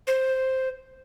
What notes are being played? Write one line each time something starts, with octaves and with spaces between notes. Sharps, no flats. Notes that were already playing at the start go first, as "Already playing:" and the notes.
C5